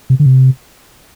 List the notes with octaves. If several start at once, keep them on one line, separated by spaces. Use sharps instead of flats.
C3
D3
C3